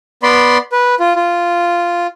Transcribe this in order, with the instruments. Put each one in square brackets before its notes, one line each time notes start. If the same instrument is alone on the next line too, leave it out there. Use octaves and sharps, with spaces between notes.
[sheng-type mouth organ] B3 D5 B5 C6
B4
F4
F4